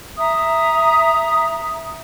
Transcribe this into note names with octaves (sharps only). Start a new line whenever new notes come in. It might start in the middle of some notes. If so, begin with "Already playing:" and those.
E5 A#5 D#6